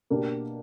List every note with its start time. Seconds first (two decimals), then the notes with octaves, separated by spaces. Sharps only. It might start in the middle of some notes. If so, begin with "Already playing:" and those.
0.10 B2 A#3 D4 G4